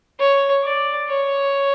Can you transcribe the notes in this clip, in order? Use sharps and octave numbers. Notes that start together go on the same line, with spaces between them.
C#5
D5
C#5